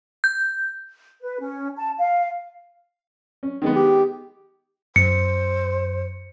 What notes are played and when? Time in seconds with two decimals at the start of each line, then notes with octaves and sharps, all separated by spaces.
0.24 G6
1.21 B4
1.40 C#4
1.77 A5
1.98 F5
3.43 C#4
3.62 D#3 G#3 B3
3.76 G4
4.96 F#2 C5 C#7